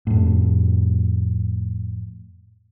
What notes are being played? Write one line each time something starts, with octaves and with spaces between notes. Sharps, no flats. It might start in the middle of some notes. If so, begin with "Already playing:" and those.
F2 A2